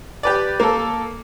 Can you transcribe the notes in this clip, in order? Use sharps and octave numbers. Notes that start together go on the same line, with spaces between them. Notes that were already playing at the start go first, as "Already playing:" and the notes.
G4 B4 D5
A#3 A4